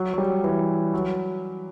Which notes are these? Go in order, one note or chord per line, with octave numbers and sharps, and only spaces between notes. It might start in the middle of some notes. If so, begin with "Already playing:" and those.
Already playing: F#3
F#3
G3
E3
F#3